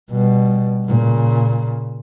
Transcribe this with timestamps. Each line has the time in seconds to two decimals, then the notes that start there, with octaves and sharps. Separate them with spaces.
0.11 B2 G3
0.87 A#2 C#3